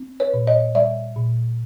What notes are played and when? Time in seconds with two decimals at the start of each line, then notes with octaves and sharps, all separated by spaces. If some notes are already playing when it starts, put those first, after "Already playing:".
Already playing: C4
0.20 B4 C#5
0.34 A#2
0.47 C#5 D#5
0.75 G3 D5 E5
1.16 A#2